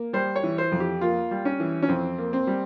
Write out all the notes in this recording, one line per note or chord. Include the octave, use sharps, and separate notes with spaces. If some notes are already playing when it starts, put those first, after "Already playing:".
Already playing: A#3
G3 C5
C#5
E3
C5
F2
G4
A#3 F4
G3
C#4
E3
C#4
F2 C4
A#3
C4
G3